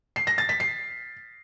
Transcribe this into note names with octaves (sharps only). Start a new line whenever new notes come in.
C7
A#6
A6
B6
C7